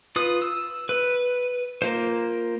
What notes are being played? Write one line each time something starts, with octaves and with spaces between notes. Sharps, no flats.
F4 B4 D#6
E6
B4
A#3 F4 C5